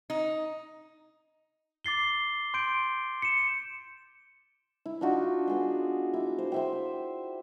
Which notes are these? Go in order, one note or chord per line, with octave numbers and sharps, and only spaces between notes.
D#4
D6 A6 C7 G7
C6 G6 D7
C#7 E7
E4
D4 D#4 F4 F#4
B3 G#4 C6
E4 D6
C5
C5 E5 G5